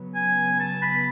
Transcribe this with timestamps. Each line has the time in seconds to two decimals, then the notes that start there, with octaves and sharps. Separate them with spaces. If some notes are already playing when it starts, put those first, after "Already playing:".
Already playing: C#3 F#3 B3
0.15 G#5
0.60 A5
0.82 B5